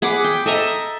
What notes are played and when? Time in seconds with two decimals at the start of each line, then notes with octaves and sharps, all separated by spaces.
0.02 G#4 F#5 B5 D6
0.24 G5
0.46 A4 D#5 E5 A#5